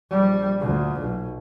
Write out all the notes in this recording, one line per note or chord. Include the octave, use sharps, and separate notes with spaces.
A#1 G3
D2 A#2
B1